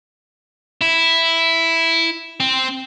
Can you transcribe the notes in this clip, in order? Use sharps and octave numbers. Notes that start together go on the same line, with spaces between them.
E4
C4